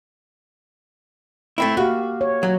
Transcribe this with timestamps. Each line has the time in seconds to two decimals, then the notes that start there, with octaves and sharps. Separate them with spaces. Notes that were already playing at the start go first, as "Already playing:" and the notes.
1.58 A3 C4 E4
1.77 A#3 F#4 G4 F5
2.21 C#5
2.43 F#3